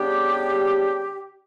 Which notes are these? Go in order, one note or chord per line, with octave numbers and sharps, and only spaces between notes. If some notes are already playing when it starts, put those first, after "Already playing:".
Already playing: C#3 G3 B3 D4 G4